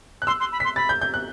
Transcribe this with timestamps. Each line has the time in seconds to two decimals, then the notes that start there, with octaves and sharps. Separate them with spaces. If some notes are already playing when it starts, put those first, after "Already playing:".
0.22 F#6
0.27 C6 E6
0.40 C6
0.52 B5
0.60 C6 B6
0.76 B5 A6
0.89 G6
1.01 G6
1.14 F#6